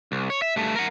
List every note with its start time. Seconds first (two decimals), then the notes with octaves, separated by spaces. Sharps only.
0.12 C2
0.30 C#5
0.42 E5
0.56 G2 A3
0.76 A#4 F#5